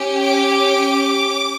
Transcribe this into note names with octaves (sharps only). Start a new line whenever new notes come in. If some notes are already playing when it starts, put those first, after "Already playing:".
Already playing: C#4 G4
D6